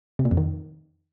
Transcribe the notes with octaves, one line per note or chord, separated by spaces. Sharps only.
C3
A#2
F2
D#3